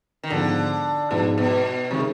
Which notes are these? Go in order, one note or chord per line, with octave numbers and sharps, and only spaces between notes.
D#3
G#2 D3 F3 B3
G#2 B2 F3 B3
B2
C3 D#3 G#3